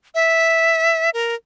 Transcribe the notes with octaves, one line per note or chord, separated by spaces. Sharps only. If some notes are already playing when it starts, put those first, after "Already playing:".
E5
A#4